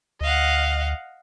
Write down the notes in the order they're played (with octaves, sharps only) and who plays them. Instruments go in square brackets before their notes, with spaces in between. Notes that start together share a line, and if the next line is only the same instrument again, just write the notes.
[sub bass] D2 [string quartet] D#5 F5 F#5